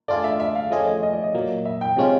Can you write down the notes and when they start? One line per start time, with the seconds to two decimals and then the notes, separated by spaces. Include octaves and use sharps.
0.08 A3 D4 F4 G#4 D5
0.24 E5
0.40 E5
0.55 F5
0.71 F3 A3 C#4 F4 G#4 D#5
0.87 D#5
1.03 D#5
1.13 D5
1.24 D#5
1.35 A#2 F#3 A#3
1.65 E5
1.81 G5
1.97 C3 F3 G#3 C#4 F4